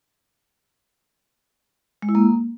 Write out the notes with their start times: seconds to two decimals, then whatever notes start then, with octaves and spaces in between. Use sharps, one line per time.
2.02 G#3
2.09 E4
2.15 A#3